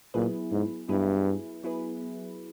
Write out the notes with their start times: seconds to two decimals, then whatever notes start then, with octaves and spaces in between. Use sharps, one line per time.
0.14 A#2 F#3 B3 E4 G#4 B4
0.51 G#2
0.88 G2 F#3 B3 E4 G#4 B4
1.63 F#3 B3 E4 G#4 B4